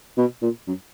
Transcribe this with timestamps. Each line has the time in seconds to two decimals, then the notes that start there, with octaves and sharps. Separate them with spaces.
0.17 B2
0.42 A#2
0.67 F#2